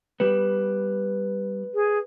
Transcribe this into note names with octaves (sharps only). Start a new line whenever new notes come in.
G3 B3 B4
G#4